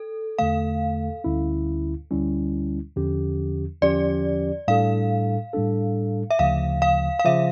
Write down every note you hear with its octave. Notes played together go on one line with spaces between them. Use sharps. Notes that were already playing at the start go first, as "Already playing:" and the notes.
Already playing: A4
E2 D3 A3 F5
D2 D3 G3 C#4 E4
D2 D3 G3 C#4 E4
E2 D3 F3 C#4 G4
E2 D3 F3 C#4 G4 D5
A2 G3 D4 A4 F5
A2 G3 D4 A4
E5
D2 C#3 F3 F5
F5
F5
C#3 F3 E5